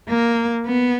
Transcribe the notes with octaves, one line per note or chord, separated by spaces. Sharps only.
A#3
B3